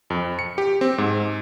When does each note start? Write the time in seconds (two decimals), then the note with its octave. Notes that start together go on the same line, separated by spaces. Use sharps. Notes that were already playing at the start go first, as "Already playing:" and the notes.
0.10 F2
0.39 C#7
0.58 G4
0.81 C4
0.98 G#2